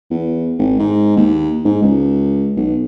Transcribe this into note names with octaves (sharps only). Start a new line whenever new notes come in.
E2
G#1
G#2
D#2
G#2
C#2
B1